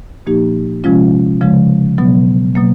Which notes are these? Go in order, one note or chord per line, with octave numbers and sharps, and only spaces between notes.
A#2 F3 A#3 D#4 G4
C3 F3 G#3 C#4 F4
C#3 F3 G#3
B2 F#3 B3
B2 F#3 A#3